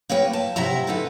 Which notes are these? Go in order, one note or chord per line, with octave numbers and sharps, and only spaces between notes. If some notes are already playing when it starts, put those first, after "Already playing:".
A#3 B4 C#5 G5
A5
C3 F#3 E4 E5 A#5
D3 D#4 A4 B4